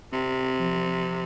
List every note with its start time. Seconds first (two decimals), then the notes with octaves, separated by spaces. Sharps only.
0.12 C3 C4
0.60 F3